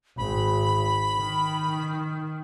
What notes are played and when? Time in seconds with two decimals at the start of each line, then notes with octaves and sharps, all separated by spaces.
0.18 G#1 B5
1.19 D#3